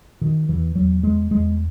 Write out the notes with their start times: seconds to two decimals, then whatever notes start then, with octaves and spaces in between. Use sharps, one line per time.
0.21 B2 D#3
0.48 E2 E3
0.75 E2 F#3
1.03 E2 G#3
1.31 E2 G#3